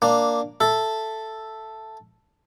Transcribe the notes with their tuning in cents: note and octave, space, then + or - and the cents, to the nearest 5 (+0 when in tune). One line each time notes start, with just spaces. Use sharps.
A#3 +0 D4 +0
A4 +0 E5 +5